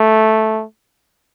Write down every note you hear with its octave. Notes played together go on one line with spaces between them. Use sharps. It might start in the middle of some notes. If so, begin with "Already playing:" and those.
Already playing: A3